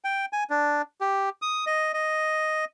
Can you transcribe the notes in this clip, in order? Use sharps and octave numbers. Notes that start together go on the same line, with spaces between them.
G5
G#5
D4
G4
D#6
D#5
D#5